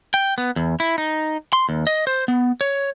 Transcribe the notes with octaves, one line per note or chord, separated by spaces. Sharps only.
G5
B3
E2
E4
D#4
C6
D#2
D#5
C5
B3
C#5